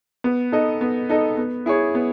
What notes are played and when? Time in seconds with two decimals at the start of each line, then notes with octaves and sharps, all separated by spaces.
0.24 B3
0.52 D#4 A4 D#5
0.81 B3
1.09 D#4 A4 D#5
1.37 B3
1.66 E4 G#4 C#5
1.95 B3